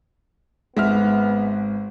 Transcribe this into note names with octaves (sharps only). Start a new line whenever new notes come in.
G#1 G#3 B3 E5 F6